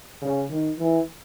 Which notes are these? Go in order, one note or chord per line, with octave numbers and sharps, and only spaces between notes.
C#3
D#3
E3